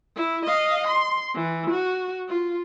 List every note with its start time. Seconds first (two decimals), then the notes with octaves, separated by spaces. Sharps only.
0.16 E4
0.45 D#5 F5
0.87 C6
1.35 E3
1.71 F#4
2.28 F4